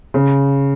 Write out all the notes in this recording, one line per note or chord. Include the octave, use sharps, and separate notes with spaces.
C#3